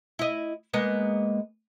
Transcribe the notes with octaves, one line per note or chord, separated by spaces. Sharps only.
E4 D#5
G#3 A#3 B3